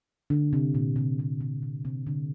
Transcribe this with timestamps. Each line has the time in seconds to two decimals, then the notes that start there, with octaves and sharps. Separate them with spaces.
0.30 D3
0.53 C3
0.75 A#2
0.96 C3
1.19 C3
1.41 C3
1.63 A#2
1.85 C3
2.07 D3